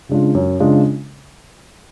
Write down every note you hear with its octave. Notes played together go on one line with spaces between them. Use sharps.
C#3 G#3 D4 F4
F#2
C#3 G#3 D4 F4